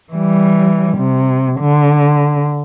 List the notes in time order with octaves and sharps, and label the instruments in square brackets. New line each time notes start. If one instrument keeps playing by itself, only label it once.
[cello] E3 G3
C3
D3